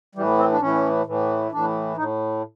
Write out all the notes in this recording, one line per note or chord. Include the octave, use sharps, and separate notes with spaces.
A2 E3 G3
C4
D4
A2 E3 C#4
A2 E3
A2 E3 D4
A2 D#4